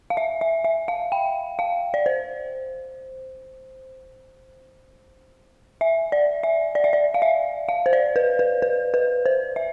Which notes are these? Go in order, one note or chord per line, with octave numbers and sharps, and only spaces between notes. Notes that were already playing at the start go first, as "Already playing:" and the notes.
F5
E5
E5
E5
F5
G5
F5
D5
C5
E5
D5
E5
D5
E5
D5
F5
E5
F5
C5
D5
B4
B4
B4
B4
C5
E5